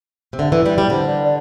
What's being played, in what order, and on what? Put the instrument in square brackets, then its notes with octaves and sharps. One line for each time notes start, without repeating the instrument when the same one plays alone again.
[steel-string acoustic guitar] C3
[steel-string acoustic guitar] D3 [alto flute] E5
[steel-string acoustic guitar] E3
[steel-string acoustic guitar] G3 [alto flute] D5
[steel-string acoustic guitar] G3
[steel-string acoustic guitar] D3 [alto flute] C5
[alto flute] D5
D5